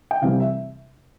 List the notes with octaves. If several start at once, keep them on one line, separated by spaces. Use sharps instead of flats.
G5
C2 C3 E3 G3 F5
E5